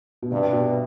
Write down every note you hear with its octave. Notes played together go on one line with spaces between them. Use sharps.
B2
G2 C3
B2